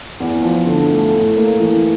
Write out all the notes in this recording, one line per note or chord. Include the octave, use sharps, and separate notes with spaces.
E2
F3
D3
A3
A2
A#3
E3